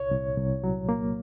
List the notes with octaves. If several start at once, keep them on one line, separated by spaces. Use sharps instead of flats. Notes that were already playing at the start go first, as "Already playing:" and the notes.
Already playing: C2 C#5
C2
C2
F#3
A#3